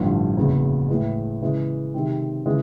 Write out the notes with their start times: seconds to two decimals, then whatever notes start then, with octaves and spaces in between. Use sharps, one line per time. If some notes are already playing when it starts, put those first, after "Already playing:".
Already playing: A1 G2 D3 F3
0.37 F#1 E2 C#3
0.88 A2 E3 G#3
1.41 C#3 E3 G#3
1.94 C3 D#3 G#3 C4
2.46 C#3 E3 G#3